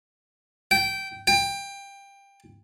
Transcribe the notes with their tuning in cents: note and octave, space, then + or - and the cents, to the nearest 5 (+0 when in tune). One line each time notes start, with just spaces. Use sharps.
G5 -15
G5 +20